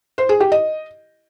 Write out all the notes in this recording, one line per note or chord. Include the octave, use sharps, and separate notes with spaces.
C5
G#4
G4
D#5